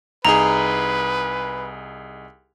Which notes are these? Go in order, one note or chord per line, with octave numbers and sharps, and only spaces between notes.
C2 D#4 G#4 B4 A#5